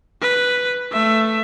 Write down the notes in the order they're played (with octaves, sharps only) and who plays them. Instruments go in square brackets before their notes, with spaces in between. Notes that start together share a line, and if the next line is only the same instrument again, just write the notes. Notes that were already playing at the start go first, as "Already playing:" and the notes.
[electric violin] B4
A3 E5